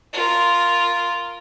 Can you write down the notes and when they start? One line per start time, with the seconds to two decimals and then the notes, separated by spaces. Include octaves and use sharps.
0.13 F4 A#4